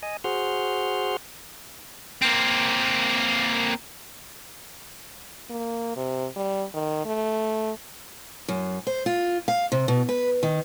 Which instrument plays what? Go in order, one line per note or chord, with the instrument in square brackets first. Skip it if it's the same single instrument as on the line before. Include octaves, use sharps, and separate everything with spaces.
[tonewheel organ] D#5 G#5
F#4 G#4 C5 F#5 C6 F6
[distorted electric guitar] A#3 C4
[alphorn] A#3
C3
G3
D#3
A3
[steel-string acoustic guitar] F#2
C5
F4
F5
C3
B2
B4
D#3